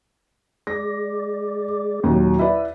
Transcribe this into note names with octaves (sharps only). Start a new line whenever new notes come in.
G#3 D5 A#6
D#2 A#2 F#3
E4 B4 D5 E5